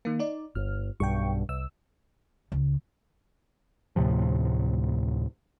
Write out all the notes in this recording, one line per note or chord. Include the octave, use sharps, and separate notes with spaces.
D#3 A#3
D#4 D5
G1 F6
B1 G2 G5 C#6
C2 E6
C#2
D2 A2 C3 F3